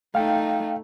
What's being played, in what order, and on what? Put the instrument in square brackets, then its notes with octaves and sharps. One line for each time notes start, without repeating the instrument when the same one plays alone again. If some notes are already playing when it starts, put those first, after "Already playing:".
[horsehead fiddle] A3 D#4 [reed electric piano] F5 G5